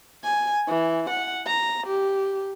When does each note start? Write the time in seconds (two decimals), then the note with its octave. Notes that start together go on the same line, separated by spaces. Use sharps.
0.24 G#5
0.67 E3
1.10 F#5
1.46 A#5
1.86 G4